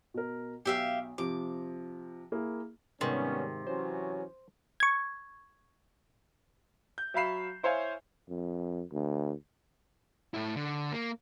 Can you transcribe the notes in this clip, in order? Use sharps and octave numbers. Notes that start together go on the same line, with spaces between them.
B2 A#4
B1 G4 E5 F5
C3 F3 D6
A#3 E4 G#4
G#1 C3 D#3 G3 B3 C#4
E3 F#3 C#4 C5
C#6 G#6
G6
F#3 E5 F5 B5 C7 E7
E4 C5 C#5 F5 G#5
F2
D2
A2 E4
D3
A#3